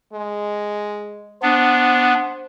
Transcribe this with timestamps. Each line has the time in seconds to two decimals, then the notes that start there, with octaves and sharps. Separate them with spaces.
0.13 G#3
1.42 B3 D4 C5